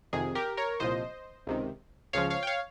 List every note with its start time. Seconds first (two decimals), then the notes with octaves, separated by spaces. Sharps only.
0.13 F2 C3 D#3 G#4
0.35 G4 A#4
0.57 A#4 C#5
0.80 C2 A#2 F3 C5 D#5
1.47 C#2 C3 D#3
2.13 C#2 C#3 F3 C#5 F5
2.30 C#5 F5
2.43 G5
2.47 C#5 F5